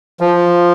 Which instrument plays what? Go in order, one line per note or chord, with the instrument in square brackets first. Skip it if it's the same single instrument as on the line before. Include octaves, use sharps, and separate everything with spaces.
[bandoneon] F3